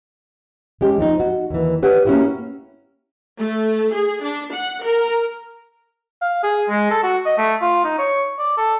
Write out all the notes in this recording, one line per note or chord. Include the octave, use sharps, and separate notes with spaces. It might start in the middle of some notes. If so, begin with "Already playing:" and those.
G#3 C#4 G4
F3 C4 D4 D#4
F#4
D#2 E3
G4 B4 C#5 F#5
A#3 C#4 D#4 E4 F#4 G4
A3
G#4
D4
F#5
A#4
F5
G#4
G#3
A4
F#4
D#5
A3
F4
D#4
C#5
D5
A4